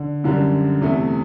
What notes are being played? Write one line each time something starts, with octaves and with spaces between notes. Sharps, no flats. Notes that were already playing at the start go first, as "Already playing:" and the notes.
Already playing: D3
F#2 D3 G3
E2 C3 E3 A3